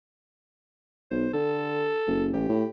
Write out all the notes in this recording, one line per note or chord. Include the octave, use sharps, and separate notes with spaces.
B1 C5
D3 A4
F#1
A1 G4
A2